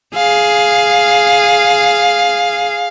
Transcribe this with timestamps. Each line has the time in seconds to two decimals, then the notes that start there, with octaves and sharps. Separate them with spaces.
0.16 G#4 F5